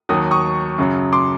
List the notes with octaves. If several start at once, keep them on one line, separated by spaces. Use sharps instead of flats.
D#2 D#3 F#3 D#6
C#6 D#6
F#2 C#3 F#3
C6 D6